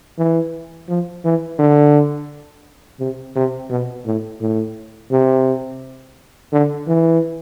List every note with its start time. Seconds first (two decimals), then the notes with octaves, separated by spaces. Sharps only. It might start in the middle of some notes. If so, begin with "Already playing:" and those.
0.18 E3
0.89 F3
1.25 E3
1.59 D3
3.00 C3
3.36 C3
3.70 B2
4.06 A2
4.41 A2
5.12 C3
6.53 D3
6.87 E3